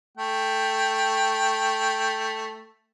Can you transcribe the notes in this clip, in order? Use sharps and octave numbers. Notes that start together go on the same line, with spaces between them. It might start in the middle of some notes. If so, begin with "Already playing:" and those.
A3 G5